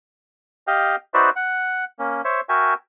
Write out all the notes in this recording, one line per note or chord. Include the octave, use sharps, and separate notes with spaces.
G4 D#5 F5 G5
D#4 F#4 B4 C5 D5 E5
F#5
A#3 C#4
C5 C#5 E5
F#4 A#4 E5 G5 G#5